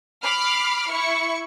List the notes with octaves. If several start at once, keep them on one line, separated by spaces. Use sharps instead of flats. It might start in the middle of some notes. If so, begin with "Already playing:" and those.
B5 D6 F6 C7
E4 C#6 C#7